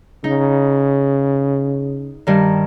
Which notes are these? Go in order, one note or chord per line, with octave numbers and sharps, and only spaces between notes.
C#3 D#4
G2 D#3